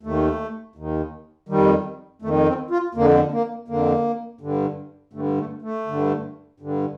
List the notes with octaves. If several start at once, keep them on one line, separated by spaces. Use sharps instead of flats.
D#2 D#3 A3
D#2 D#3
F2 D#3 G3
F2 D#3 A3
C4
F4
F2 D3 A#3
A#3
F2 D3 A#3
G2 D3
G2 D3 A3
A3
A3
G2 D3
G2 D3